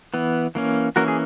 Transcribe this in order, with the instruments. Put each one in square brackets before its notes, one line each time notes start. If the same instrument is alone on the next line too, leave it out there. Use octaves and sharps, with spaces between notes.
[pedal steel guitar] E3 B3
E3 A#3 C#4
E3 A#3 C#4 F#4 A#4
G#4